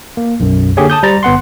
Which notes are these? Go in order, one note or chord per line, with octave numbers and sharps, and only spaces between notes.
A#3
B1 F#2
D3 A#3 G4 G#4 C#5
A5 D#6 G6
G3 C5 A#5 A6
G1 B3 F#5 C6